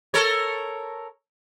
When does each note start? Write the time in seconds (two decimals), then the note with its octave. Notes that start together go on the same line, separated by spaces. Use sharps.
0.14 A4 A#4 C#5